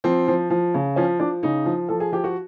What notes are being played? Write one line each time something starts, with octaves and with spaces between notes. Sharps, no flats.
F3 C4
F3
F3
C#3
F3 C#4
F3 D4
C#3 D#4
F3
F3 A4
G#4
F3 G4
F#4